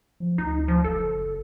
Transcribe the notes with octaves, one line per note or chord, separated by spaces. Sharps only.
F3
D2 D#4
F3
F#1 A4